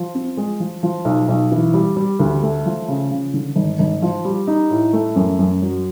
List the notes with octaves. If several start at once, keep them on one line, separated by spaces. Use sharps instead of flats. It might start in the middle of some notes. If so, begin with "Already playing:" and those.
Already playing: F3
C4
G#3
F3
F3
B1
B1
E3
G3
G3
D2
A3
F3
C#3
C#3
D3
G#1
G#1
F3
G3
D#4
A2
A3
F#2
F#2
F#3